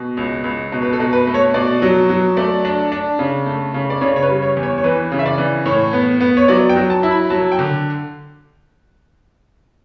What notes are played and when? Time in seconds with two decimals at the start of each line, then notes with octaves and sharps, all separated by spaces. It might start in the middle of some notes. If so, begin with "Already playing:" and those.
Already playing: B2
0.17 C#2
0.44 C#2
0.72 B2
0.82 B4
0.93 A4
1.00 B2
1.13 B4
1.27 A3
1.34 C#5
1.54 B2 D5
1.82 F#3
2.09 F#3
2.37 A3 D5
2.65 D4
2.92 D4
3.19 C#3
3.46 A3
3.74 C#3
3.90 D5
4.01 C#3 C#5
4.16 C#5
4.23 B4
4.28 G3
4.42 C#5
4.57 E2
4.63 C#5
4.78 C#5
4.84 E3 B4
5.12 C#3
5.19 E5
5.26 D5
5.38 E3
5.65 A2 C#5
5.93 B3
6.20 B3
6.37 C#5
6.48 F#3 D5
6.69 G5
6.76 F#3
6.90 A5
7.03 E4
7.11 B5
7.30 F#3 A5
7.52 G5
7.59 D3